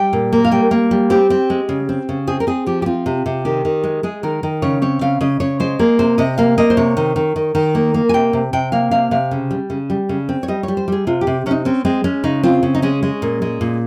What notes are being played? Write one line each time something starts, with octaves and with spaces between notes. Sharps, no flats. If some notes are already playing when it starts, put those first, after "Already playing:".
Already playing: G3 G5
A#2
A#3
F5
G3 G5
A#3
G3
C4 G4
C4
G#3
C#3
C4
C#3
C4 G#4
A#4
C4 G#4
F3 G4
G4
C4 F4
C3
C3
D#3 G4
D#3
G#3
G#3 G#4
D#3 A#4
D#3
C#3 C#5
C4 C#5
C#3 F5
C#3 D#5
C#3 C#5
G#3 C5
A#3 G#4
C3 C5
C3 D#5
A#3 F5
A#3 D#5
C5
C3 C#5
D#3
D#3
D#3
D#3
A#3
A#3
G#5
C3 G5
C3
C3 G5
A#3 F5
C3 F5
C3 F5
C#3
G3
C#3
G3
C#3
C4
C#5
G3 D#5
C#5
G3
C5
G3 G#4
C3 F4
G4
C3
C3 C#4 D#4
C4 C#4
G#3 C4
G#3 C#4
C#3 D#4
C4 F4
C#3
D#4
G#3 C#4
G#3
A#2
G#3
A#2